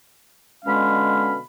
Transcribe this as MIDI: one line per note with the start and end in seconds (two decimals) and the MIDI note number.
0.65 1.37 47
0.65 1.37 50
0.65 1.37 56
0.65 1.37 61
0.65 1.37 77
0.65 1.37 83